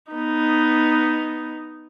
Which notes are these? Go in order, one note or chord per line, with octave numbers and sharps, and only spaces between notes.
B3 D#4